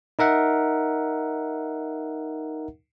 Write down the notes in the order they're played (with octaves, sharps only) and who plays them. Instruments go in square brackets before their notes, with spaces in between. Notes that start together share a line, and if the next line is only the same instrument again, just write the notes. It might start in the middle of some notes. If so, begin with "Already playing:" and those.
[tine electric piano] D#4 A#4 E5 F#5